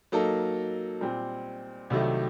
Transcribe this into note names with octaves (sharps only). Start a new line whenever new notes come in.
F#3 A#3 D#4 A4
A#2 G3 C4
C2 C3 D#3 F#3 A3